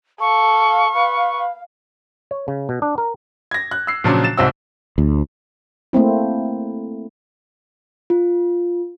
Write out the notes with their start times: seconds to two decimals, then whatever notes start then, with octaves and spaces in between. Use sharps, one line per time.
0.20 A4 F5 C#6
0.96 B4
2.31 C#5
2.48 C#3
2.69 B2
2.82 D4
2.98 A#4
3.51 G#6 A#6
3.71 F#6
3.87 E6 C7
4.04 A#2 C#3 F3 F#3 D4
4.24 A6 E7
4.37 C2 G#2 C4 F#4 E6
4.98 D2
5.93 A3 A#3 C4 E4
8.10 F4